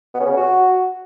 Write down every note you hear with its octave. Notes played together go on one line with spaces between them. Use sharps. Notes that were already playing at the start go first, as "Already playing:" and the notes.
B3
C#4
C#3
C#4
F#4